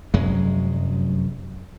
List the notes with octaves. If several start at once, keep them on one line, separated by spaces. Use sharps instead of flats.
F1 F#2 F#3 G#3